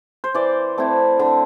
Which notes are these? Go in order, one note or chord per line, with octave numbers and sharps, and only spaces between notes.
C5
E3 D5
A3 C4 E4
D3